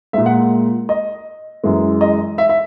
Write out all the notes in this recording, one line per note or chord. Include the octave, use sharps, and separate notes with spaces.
A#2 G#3 E5
F#5
D#5
F#2 E3 G#3
D#5
E5
E5